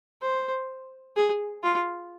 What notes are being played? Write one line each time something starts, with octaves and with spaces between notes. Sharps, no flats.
C5
G#4
F4